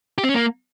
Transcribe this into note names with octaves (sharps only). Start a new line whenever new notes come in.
G4
C4
C#4
A#3